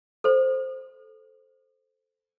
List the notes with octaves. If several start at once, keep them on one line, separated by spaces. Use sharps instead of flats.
A4 C5